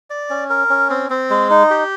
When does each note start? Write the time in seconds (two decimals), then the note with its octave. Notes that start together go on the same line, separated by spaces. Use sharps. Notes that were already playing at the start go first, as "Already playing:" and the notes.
0.10 D5
0.30 C#4
0.50 A#4
0.70 C#4
0.90 C4
1.10 C4
1.30 G#3
1.51 D#4
1.71 G4